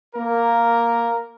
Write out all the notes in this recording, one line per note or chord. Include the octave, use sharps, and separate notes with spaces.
A#3 A#4